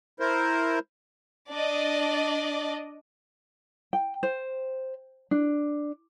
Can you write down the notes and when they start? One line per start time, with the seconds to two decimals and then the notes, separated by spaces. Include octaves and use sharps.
0.20 E4 A#4 C5
1.50 D4 D5 D#5
3.93 G5
4.23 C5
5.31 D4